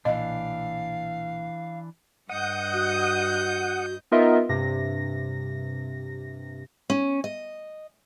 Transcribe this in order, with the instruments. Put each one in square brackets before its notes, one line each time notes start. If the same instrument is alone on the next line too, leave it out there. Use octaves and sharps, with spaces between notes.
[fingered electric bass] B1 A#2 [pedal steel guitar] E3 D4 [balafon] D#5 [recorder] F5
[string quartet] G2 D#5 G6 [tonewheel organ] F#5 D#6
[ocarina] F#4
[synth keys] B3 D#4 F4 A#4 D#5 E5
G2 C3 A#6
[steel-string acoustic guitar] C#4
D#5